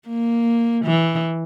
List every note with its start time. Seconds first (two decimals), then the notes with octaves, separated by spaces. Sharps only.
0.08 A#3
0.85 E3